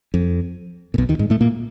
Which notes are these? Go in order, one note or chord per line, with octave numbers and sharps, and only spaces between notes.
F2
A#2
B1 B2
D#2 D#3
G#2 G#3
A2 A3
A#2 A#3